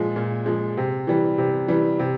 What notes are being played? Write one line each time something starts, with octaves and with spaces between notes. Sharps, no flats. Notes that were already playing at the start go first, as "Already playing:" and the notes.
Already playing: A#2 F3 G#3
A#2
F3 G#3
C3
E3 G3
C3
E3 G3
C3